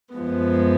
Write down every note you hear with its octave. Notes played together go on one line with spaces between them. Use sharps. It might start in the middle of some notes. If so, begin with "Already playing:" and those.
F#2 F3 G#3 B3